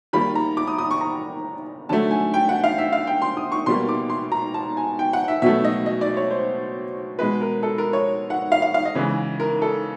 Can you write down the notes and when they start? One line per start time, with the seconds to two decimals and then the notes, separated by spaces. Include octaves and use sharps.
0.13 D#3 G3 A#3 B5
0.35 A#5
0.57 D6
0.67 D#6
0.78 D#6
0.91 C#6
1.01 A#5
1.89 D3 F#3 A3 A5
2.11 G#5
2.34 G5
2.49 F#5
2.64 F5
2.78 E5
2.93 F5
3.07 G5
3.22 C6
3.37 D#6
3.52 C#6
3.66 B2 G3 A#3 C6
3.89 D6
4.10 C6
4.32 A#5
4.54 A5
4.77 G#5
4.99 G5
5.13 F#5
5.28 E5
5.42 B2 F#3 A3 E5
5.65 D#5
5.86 D#5
6.01 D5
6.17 C#5
6.31 C5
7.19 B2 G#3 B4
7.41 A#4
7.63 A4
7.78 A#4
7.93 C#5
8.30 F#5
8.52 F5
8.62 F5
8.74 F5
8.85 D#5
8.95 C#3 E3 G#3
9.40 A#4
9.62 A4